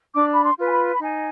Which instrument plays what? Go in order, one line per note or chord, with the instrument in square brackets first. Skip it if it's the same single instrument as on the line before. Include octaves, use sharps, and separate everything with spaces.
[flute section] D4 D6
B5
C6
F4 B4
G#5
B5
B5
D#4 G#5